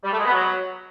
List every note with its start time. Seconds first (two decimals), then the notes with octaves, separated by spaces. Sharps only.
0.04 G3
0.11 A3
0.18 G#3
0.25 B3
0.32 F#3